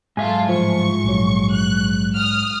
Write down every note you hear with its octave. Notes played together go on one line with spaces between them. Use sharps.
G#2 F#3 F4 A4 E5 G#5
A2 F3 C#6
A#1 F#3
F#6
D#6 F6